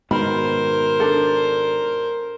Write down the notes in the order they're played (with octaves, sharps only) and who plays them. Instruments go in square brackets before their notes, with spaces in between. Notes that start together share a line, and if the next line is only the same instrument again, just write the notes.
[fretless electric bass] G#2 B2 D#3 [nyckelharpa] A#4 C5 [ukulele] B5
[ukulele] D4 A4